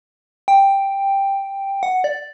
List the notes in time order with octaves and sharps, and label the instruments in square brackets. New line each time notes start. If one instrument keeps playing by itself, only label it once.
[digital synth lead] G5
F#5
D5